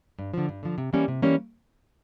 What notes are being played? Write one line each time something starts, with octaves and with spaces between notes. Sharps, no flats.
G2
D3 F3
G2
D3 F3
C3
E3 G3 A#3 C#4
C3
E3 G3 A#3 C#4